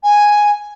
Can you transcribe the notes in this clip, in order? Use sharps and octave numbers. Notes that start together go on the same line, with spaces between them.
G#5